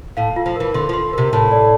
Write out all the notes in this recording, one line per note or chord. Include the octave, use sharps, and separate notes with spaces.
A2 F5
F4
F3
E3 A#4
D3 C6
F3 C6
C3 A#4
A2 A5
D5